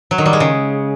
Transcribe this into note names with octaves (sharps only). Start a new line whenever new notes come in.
F#3
D#3
G3
G#3
C#3